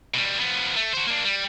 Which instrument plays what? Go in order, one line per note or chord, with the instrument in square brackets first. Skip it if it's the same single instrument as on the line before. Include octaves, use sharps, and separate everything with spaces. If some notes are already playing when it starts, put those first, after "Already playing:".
[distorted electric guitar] B2 G3
F3 B3
A3
F#4 C5
A#3 D4
G3